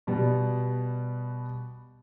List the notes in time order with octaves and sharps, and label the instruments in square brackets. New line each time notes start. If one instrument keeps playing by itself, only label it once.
[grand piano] B2 G3 B3